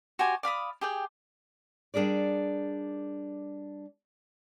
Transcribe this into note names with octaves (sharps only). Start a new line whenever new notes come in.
F#4 G4 C5 G#5
D5 F5 B5 D#6
G4 G#4 G5
G3 D4 G#4 A#4 D5